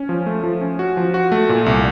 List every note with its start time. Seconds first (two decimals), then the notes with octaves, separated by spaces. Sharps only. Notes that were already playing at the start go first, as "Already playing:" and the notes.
Already playing: C#4
0.09 F3
0.26 A3
0.43 F3
0.61 C#4
0.79 F#4
0.97 F3
1.14 F#4
1.32 A3
1.49 A#2
1.66 C2